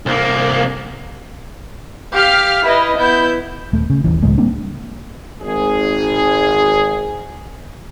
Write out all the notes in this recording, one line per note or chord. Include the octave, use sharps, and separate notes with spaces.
C2 A#3
G4 F5 F6 B6
E4 B4 D#5
B3 E4 G6
D#1 A3
C#3
D#1 G#1 E3
C#2 A2 G#3 A3
G3 A#3 C4 D4
G#1 G#4